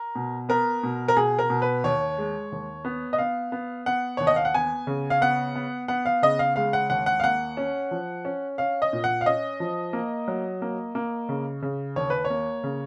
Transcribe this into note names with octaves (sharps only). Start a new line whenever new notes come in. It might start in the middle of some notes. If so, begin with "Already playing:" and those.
Already playing: A#4
B2
B3 A#4
B2
A#4
B2 G#4
A#4
B2
B4
D#2 C#5
G#3
D#2
B3
D#5
B3 F5
B3
B3 F#5
D#2 C#5
D#5
F5
F#5
B3 G#5
C#3
F5
B3 F#5
B3
B3 F#5
F5
C#3 D#5
F5
G#3 F5
F#5
D#2 F#5
F#5
F5
A#3 F#5
C#4
F3
C#4
C#4 F5
D#5
A#2
F#5
F5
C#4 D#5
F3
A#3
F#3
A#3
A#3
C#3
C#3
D#2 C#5
B4
C#5
A#3
C#3